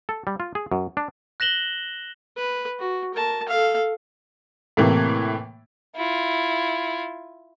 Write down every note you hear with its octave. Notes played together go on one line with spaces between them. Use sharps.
A4
G3
F4
G#4
F#2
D4
F#6 A#6 E7 F#7 G7
B4
F#4
A#4 A5
A4 F5
A2 C3 E3 A#3
E4 F4